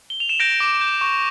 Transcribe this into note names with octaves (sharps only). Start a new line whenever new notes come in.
G7
F7
E7
G6 A#6 D7
D6
G6
C#6